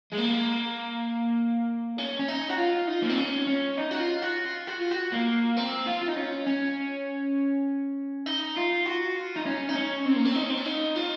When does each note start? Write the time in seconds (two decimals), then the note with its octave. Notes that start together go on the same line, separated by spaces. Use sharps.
0.13 G#3
0.19 A#3
1.98 C#4
2.19 C#4
2.28 D#4
2.49 F#4
2.58 F4
2.87 D#4
3.02 A#3
3.09 C4
3.17 C#4
3.47 C#4
3.77 D#4
3.91 F#4
3.99 F4
4.22 F#4
4.45 F4
4.67 F#4
4.79 F4
4.91 F#4
5.12 A#3
5.58 C4
5.87 F4
6.02 F4
6.09 D#4
6.17 C#4
6.46 C#4
8.26 D#4
8.56 F4
8.86 F#4
9.16 F4
9.36 D#4
9.46 C#4
9.69 D#4
9.75 C#4
10.06 C4
10.16 A#3
10.25 C4
10.35 D#4
10.43 C#4
10.49 C4
10.57 C#4
10.65 D#4
10.96 F4